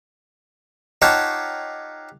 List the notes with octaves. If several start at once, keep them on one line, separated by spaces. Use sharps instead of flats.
D#4 F4 G4 C#5 F#5 A5